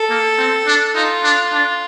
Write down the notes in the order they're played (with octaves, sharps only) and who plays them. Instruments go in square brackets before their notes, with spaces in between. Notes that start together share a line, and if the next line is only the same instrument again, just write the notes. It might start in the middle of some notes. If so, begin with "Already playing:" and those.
Already playing: [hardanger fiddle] A4
[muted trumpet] A#3
C4
D4
[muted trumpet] D#4 [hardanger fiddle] F4
[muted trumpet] D4
D4